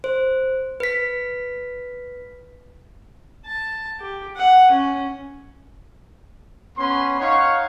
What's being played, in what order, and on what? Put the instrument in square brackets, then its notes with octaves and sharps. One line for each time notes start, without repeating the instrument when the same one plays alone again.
[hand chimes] C5
B4 B6
[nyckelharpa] A5
G4
F#5
C#4
[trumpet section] B3 C#4 B5 C6
D#4 C#5 F5 F#5 C#6